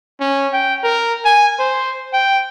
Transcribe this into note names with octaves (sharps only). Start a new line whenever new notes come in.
C#4
G5
A#4
G#5
C5
G5